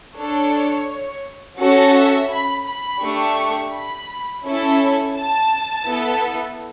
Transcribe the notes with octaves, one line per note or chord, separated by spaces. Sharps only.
D4 A4 C#5
C#4 F#4 A4
E5
B5
B5
A3 D4 G4 C#6
B5
C#4 E4 A4
A5
B3 E4 A4